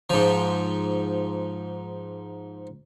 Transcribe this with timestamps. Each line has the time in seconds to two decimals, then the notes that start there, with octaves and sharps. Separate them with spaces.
0.10 G#2 F3